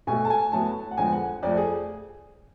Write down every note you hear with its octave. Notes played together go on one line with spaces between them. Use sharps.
B2 A3 G#5
A5
G#5
A2 F#3 B3 A5
F#5
F2 D3 G#3 B3 G#5
F#5
F2 F3 A3 D5
G#4